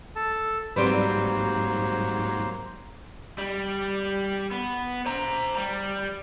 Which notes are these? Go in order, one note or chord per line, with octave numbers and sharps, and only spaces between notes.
A4 A5
G#2 F#3 G3 A#3 C4 B4 C5
G3
B3
C5 A#5
G3